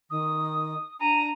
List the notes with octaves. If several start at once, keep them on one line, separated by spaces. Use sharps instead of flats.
D#3 D#6
D4 A#5 D#7